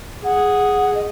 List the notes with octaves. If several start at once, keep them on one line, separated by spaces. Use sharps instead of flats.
G#4 F#5
D#5